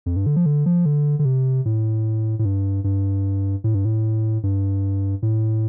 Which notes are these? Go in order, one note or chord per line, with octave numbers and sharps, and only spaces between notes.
F2
G2
D3
F3
D3
F3
D3
D3
C3
A2
A2
G2
G2
A2
G2
A2
G2
A2